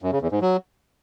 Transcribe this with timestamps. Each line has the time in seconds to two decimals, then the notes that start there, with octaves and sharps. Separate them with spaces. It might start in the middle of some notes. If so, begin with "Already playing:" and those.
0.02 F#2
0.12 C#3
0.22 E2
0.31 G#2
0.41 F#3